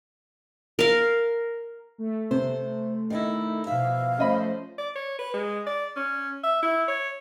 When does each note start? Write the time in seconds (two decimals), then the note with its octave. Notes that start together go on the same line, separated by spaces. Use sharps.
0.79 A#4 F5
1.98 A3
2.31 C3 C5
3.10 D#3 D#4 E4
3.67 B2 F3 E5 F5
4.19 F3 A3 C#4 C5 D#5 B5
4.78 D5
4.96 C#5
5.19 B4
5.33 G#3
5.67 D5
5.96 C#4
6.44 E5
6.63 E4
6.88 C#5